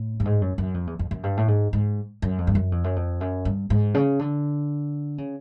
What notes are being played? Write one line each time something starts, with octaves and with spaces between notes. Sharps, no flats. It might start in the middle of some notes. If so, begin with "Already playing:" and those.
Already playing: A2
G2
G#2
F#2
F#2
F2
E2
F2
F#2
G2
A2
G#2
G#2
F#2
F2
G2
F#2
F2
F#2
F2
F#2
G2
G#2
C#3
D3
C#3